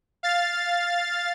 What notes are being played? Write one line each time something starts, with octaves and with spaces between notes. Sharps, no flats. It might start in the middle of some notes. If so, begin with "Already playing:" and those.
F5 A6